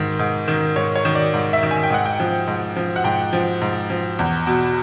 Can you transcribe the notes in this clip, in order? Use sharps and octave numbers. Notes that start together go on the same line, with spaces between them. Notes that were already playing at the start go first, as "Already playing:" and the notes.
Already playing: G#2 D#3
G#2
D#3
G#2 C#5
C#5
D#3
D5
G#2
E5
D#3
G#5
G5
G#2 F#5
G5
F3
G#2
F3
F#5
G#2 G5
F3
G#2
F3
E2
B2